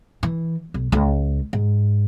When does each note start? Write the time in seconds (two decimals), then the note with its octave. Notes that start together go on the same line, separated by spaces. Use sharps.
0.23 E3
0.74 B1
0.92 C#2
1.53 G#2